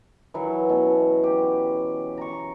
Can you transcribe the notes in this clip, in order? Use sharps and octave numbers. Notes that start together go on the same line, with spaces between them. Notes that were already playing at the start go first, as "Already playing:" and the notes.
E3 F#3
B2 C#4
G4
A#5 C#6